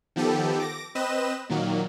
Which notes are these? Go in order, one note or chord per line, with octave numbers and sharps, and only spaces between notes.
D#3 F3 B3 G4 A4
D6 A#6
C4 B4 D#5 E7
A#2 D#3 F#3 A#3